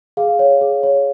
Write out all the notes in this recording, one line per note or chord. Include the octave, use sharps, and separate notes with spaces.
G#4 F5
C#5
G#4
C#5